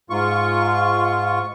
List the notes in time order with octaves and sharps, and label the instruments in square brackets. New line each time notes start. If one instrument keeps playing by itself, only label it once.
[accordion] G#2 F4 C#6